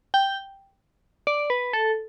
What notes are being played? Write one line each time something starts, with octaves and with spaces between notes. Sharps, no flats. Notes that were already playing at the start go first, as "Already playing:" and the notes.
G5
D5
B4
A4